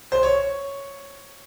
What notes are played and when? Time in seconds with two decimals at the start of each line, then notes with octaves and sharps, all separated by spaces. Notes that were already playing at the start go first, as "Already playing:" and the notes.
0.12 C5
0.23 C#5